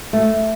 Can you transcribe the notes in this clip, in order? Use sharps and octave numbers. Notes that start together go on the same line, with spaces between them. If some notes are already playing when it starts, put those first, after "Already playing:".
A3